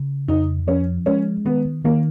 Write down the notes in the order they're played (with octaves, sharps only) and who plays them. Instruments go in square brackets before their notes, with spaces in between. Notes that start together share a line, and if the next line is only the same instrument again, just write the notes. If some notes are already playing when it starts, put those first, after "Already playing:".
Already playing: [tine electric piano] C#3
[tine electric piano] F2 [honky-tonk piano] D#4
[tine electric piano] F3 [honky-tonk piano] C#4
[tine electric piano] G#3 [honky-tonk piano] C#4
[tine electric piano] D#3 [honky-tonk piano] B3
[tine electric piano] D#3 [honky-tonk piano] A#3